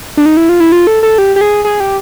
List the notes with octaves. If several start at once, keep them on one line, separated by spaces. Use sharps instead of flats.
D4
D#4
E4
F4
E4
F4
A4
A4
G4
G4
G#4
G#4
G4